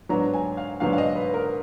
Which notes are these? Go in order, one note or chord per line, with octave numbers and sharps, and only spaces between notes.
G#2 F#3 B3 D4 A#5
G#5
F5
G#2 F#3 B3 D4 F5
F5
D#5
B4
A#4